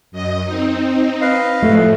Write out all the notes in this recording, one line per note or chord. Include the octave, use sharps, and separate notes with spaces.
F#2 D#5
C4 D#4
B4 D#5 F5
A2 F3 A3